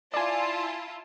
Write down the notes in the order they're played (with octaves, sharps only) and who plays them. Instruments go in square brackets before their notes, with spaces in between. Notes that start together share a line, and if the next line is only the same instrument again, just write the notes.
[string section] E4 F4 A5 [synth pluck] D5 G#5